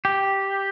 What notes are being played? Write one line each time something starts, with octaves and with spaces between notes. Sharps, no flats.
G4